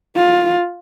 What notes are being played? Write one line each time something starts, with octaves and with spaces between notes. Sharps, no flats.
F4